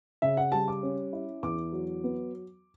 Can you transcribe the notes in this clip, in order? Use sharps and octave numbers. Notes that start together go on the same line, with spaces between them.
C#3 E5
F#5
G3 A5
D6
C#4
E4
E2 D6
F#3
B3